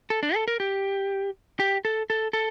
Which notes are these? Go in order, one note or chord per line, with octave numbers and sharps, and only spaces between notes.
A4
D4
A4
A#4
G4
G4
A4
A4
A4